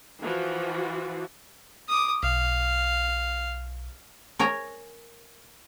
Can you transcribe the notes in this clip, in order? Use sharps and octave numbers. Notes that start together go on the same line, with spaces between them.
E3 F3 F#4
D6 D#6
B1 F5
A#4 C#5 G#5 A#5